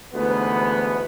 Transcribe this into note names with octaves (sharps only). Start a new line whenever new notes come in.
D2 G#2 E3 B3